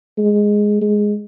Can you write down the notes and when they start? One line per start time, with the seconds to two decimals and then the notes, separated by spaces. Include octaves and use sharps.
0.18 G#3
0.81 G#3